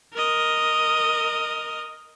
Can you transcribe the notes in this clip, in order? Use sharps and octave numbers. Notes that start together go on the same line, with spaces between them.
A#4 D#5